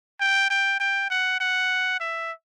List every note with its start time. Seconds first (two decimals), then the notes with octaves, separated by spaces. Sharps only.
0.20 G5
0.50 G5
0.80 G5
1.10 F#5
1.40 F#5
2.00 E5